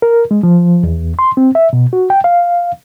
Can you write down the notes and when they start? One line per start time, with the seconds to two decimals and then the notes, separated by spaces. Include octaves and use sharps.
0.02 A#4
0.31 G#3
0.43 F3
0.83 E2
1.19 C6
1.37 C4
1.55 E5
1.73 B2
1.93 F#4
2.10 G5
2.24 F5